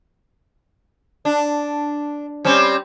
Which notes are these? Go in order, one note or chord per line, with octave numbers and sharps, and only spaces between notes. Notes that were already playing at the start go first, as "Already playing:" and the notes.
D4
G3 C4 C#4